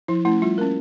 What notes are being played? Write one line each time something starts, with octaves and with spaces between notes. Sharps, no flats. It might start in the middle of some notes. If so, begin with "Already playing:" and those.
F3 E4
A3 C#4 E4
G3 F4
A#3 C#4 A#4